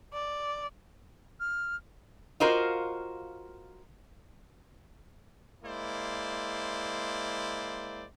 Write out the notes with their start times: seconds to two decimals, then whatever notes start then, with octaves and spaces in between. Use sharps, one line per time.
0.13 D5
1.40 F6
2.40 F4 F#4 A#4 C5 D#5 F5
5.64 G#3 A#3 E4 C5 D5